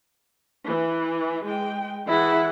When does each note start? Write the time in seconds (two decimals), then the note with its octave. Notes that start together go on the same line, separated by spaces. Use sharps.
0.67 E3
1.44 G#3 G5
2.09 E3 E4 G#4 F#5